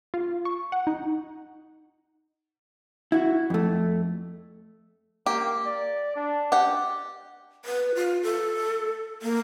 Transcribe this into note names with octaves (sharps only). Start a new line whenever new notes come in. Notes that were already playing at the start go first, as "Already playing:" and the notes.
F4
C#6
F#5
D#4
E4 F#4
F2 A3
A#3 G4
D5
D4
G4 F#5
B4
F4
A4
A#3